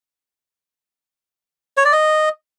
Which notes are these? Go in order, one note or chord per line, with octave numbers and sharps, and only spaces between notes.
C#5
D5
D#5